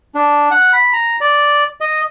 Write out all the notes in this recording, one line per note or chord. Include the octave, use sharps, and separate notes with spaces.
D4
F#5
B5
A#5
D5
D#5